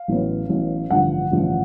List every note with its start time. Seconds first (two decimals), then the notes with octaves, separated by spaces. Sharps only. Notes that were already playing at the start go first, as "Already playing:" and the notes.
Already playing: F5
0.08 A1 A2 F#3 B3
0.49 A1 A2 F#3 B3
0.91 A1 G2 D3 F3 F#5
1.31 A1 G2 D3 F3